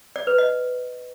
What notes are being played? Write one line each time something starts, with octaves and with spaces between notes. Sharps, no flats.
D5
B4
D#5